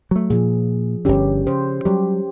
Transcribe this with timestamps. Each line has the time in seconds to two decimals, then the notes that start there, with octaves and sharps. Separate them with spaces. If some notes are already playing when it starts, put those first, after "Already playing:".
0.11 F#3 A3
0.30 A#2 F3 G#4
1.05 G1 D3 C#4 G4
1.47 C#3 C5
1.85 F#3 G3 G4